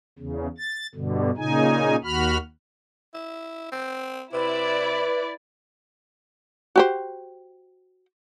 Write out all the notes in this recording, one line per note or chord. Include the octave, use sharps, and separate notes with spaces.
E2 C#3
A6
G2 B2 D3
A#2 C#3 D#4 G#5
D#2 F#4 B5 F6
E4
C4
C3 E4 B4 D5
F#4 G4 C5